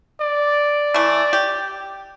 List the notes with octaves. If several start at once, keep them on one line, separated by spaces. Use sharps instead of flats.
D5
E3 A3
G4